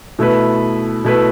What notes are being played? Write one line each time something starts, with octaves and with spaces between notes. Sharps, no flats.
B2 A3 E4 B4
B2 A3 E4 B4